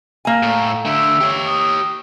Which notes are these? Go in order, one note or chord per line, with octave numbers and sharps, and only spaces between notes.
A#3 G#5
A2
D3 A3 E5
G4 C#5
D#6